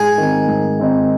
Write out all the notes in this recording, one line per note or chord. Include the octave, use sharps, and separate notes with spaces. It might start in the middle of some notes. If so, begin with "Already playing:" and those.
Already playing: G#2 G#4
D#3 C4 D#4
G#2
D#3 C4 D#4